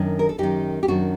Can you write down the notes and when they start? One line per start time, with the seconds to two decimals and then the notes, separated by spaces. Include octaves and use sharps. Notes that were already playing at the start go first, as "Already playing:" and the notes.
Already playing: F#2 D#3 D4
0.19 A#4
0.29 A4
0.38 F#2 D#3 D#4 G4
0.83 G4
0.88 F#2 D#3 D4 F#4